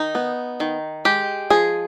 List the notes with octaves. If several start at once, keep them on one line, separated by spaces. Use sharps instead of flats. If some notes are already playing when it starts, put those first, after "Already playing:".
Already playing: D#3 D#4
B3
D#3
G#3 G4
F3 G#4